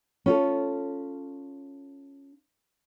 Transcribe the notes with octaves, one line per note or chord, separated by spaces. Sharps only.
C#4 F4 A4